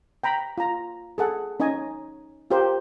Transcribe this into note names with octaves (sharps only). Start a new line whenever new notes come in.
G5 A#5 B5
F4 A#5
G#4 A4 F#5
C#4 D#4 C#5 D#5 G#5
F4 G4 A#4 C5